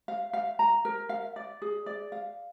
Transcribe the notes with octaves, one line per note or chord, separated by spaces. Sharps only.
F5
F5
A#5
A#4
F5
D5
G#4
D5
F5